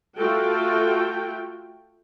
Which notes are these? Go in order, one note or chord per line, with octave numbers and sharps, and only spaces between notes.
A3 F4 F#4 A4 G5